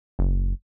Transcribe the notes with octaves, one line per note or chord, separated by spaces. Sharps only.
F#1